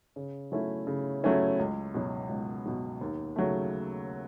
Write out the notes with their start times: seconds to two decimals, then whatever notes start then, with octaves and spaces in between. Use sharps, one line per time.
0.16 C#3
0.52 F#3 A3 C#4 E4
0.87 C#3
1.24 F#3 A3 C#4 E4
1.59 C#2
1.94 B2 F#3
2.29 C#2
2.66 B2 F#3
3.01 D#2
3.36 C#3 F#3 A3